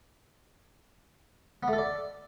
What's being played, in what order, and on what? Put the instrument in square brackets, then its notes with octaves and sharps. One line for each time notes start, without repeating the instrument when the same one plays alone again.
[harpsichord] B3
A3
A4
D5